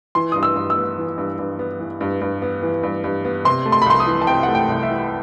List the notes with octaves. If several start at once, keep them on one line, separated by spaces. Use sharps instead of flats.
E3 C6
G2 D#6
E6
G2
E6
B3
E3
G2
G2
B3
E3
G2
G2
B3
E3
G2
G2
B3
C3 C6
A3
C6
B5
C2 C6
D#6
E3
A5
C3 G5
F#5
A3
G5
C2
E5
E3